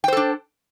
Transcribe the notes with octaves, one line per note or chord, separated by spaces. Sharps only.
D4 A4 C5 G5